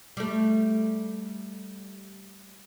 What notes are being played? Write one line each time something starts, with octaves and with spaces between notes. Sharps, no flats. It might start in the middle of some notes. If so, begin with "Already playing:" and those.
G3 A3